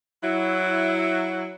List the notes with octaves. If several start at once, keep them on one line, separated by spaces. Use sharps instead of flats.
F#3 E4